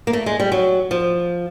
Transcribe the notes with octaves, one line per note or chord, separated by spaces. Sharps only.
A#3
A3
G#3
G3
F#3
F3